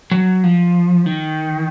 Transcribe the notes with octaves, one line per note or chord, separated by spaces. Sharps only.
F#3
F3
D#3